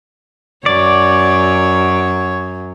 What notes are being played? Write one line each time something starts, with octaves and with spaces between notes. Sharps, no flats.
F#2 C#5 D5